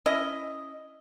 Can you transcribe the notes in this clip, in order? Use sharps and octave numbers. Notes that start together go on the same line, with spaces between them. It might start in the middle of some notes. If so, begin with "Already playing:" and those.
C#4 E4 D#5